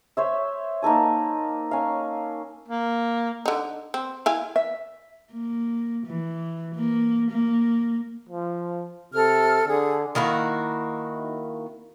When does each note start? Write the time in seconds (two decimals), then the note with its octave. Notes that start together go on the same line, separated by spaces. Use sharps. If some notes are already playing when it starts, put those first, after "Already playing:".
0.17 C5 C#5 E5
0.82 A#3 D#4 A4 G#5
1.71 C#4 F5
2.68 A#3
3.46 D3 D#4
3.94 C4
4.26 E4 F5 G#5
4.56 E5
5.33 A#3
6.06 E3
6.75 A#3
7.31 A#3
8.29 F3
9.14 C3 A4 F6
9.67 D3 G#4
10.15 D#3 A#3 E4 F#4